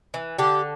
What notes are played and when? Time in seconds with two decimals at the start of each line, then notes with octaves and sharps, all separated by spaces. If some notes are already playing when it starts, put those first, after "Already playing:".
0.14 E3
0.38 D3 G4